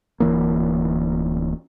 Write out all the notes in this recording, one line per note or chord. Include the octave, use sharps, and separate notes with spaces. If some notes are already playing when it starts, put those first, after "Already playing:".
D1 E3 A#3